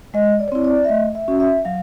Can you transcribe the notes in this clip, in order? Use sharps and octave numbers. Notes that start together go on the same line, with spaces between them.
G#3 D#5
D5
C#5
C4 E4 D5
D5
E5
A3 D#5
E5
C#4 F#4
E5
F#3 F5